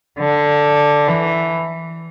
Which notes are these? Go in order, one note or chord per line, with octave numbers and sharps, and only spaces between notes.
D3
E3